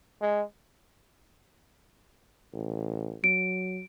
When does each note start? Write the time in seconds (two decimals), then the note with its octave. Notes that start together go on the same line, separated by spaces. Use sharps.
0.22 G#3
2.53 A1
3.24 F#3 D7